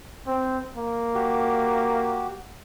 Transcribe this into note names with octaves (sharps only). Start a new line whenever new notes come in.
C4
A#3
F#4 G4